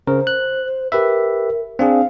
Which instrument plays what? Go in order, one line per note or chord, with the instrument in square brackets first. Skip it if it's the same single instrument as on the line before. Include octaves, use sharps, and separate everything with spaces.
[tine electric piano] C#3 A#4 [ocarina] C5
[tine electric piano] F#6
[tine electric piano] G4 B4 E5 [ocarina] A#4
[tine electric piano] C4 D4 G#4 [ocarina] F5